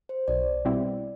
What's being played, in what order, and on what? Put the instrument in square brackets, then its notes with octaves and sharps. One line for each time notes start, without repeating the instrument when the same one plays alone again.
[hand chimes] C5
[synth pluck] B1 [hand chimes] D5
[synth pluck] B2 G3 C4 E4